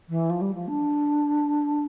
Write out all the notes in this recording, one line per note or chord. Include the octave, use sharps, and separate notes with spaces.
E3
F3
G3
F3
D4